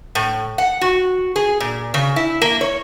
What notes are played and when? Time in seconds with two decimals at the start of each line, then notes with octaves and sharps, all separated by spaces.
0.15 A2
0.58 F#5
0.81 F#4
1.36 G#4
1.60 A#2
1.94 C#3
2.16 E4
2.42 A#3
2.61 C#5